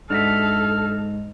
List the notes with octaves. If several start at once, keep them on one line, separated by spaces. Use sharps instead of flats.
G#2 D4 F#4 A4 E5 F6